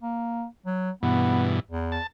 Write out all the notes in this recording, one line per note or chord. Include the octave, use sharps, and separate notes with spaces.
A#3
F#3
G2 B2 E3 B3
E2
A5